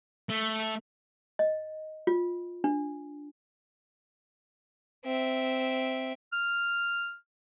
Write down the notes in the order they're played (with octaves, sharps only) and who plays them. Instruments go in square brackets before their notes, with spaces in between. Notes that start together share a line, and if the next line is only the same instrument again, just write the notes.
[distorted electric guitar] A3
[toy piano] D#5
F4
D4
[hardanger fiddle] C4 E5
[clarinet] F6